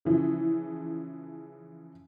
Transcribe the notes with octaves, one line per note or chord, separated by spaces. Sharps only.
C#3 E3 F3